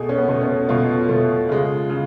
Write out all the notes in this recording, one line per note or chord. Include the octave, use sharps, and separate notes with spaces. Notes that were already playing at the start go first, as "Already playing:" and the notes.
Already playing: B2 A3 G#4
C#4
B3
B2 A3
C#4
B2 A3 F4
B2 A3
C#3 G#3 F4
C#3